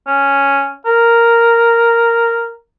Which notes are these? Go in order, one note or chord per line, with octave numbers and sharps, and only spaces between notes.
C#4
A#4